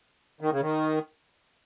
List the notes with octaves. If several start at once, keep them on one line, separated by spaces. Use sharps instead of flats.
D#3
C#3
D#3